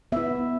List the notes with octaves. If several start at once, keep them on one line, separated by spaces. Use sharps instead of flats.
B3 E4 E5